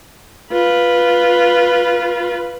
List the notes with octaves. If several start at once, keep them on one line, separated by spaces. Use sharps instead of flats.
F4 B4